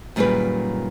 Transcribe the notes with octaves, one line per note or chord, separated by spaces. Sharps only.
F#2 A#2 D#3 G3 G#4 B4